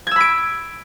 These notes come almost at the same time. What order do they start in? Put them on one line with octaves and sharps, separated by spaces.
G#6 E6 B5 D7